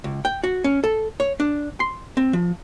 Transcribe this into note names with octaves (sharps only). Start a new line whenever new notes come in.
C#2
G5
F#4
C#4
A4
C#5
D4
C6
C4
F3